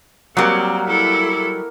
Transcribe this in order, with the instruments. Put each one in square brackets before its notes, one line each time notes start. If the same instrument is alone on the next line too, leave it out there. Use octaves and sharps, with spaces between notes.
[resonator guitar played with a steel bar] F#3 G3 [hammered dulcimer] A#3 F#5 [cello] C4
[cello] E4 A4